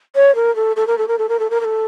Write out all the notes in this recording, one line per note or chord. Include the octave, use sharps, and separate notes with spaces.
C#5
A#4
A4
A4
A#4
A4
A#4
A4
A#4
A4
A#4
A#4
A4